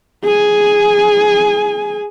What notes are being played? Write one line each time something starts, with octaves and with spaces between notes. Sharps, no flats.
G#4 G#5